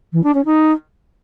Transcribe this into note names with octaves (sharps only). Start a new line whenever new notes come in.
E3
D4
C#4
D#4